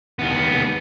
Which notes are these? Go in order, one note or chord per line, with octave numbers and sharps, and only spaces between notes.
D#2 B3